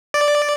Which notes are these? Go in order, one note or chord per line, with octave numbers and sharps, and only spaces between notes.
D5